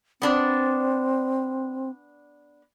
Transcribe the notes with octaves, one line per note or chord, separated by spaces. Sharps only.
B3 C4 D4 D5